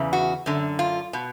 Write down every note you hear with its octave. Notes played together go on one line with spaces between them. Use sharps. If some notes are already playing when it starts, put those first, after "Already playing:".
Already playing: E2 C#3 E3
F#4
F#2 D3
F4
B2